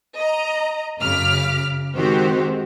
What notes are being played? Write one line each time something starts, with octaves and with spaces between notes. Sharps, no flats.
D#5 A#5
F#2 C#3 D6 F6 B6
D#3 G#3 C4 F#4 G4 C5